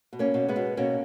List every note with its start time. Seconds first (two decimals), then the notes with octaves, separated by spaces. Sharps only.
0.13 B2
0.19 A#3 C#4
0.34 B2
0.48 G#3 B3
0.56 B2
0.77 B2 A#3 C#4